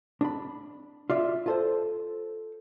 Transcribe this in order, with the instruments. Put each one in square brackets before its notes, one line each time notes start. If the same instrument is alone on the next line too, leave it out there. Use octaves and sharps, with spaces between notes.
[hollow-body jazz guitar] D4 B5
F4 D5 E5
F4 A4 C5